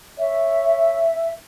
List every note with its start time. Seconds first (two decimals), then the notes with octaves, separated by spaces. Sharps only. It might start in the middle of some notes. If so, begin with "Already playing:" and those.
0.19 C#5 E5